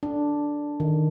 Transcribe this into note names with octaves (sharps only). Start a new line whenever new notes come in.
D4
D#3